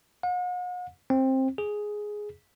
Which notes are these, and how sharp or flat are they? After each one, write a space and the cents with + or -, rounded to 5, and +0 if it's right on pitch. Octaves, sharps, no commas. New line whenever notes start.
F#5 -45
C4 +15
G#4 +5